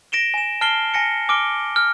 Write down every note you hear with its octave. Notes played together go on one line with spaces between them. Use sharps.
A#6 D7 E7 G7
G#5 E7
A5 F6 A6 C7 D7 G7
G#5 A#6 C#7
G#5 D6 F6 D7 G7
F6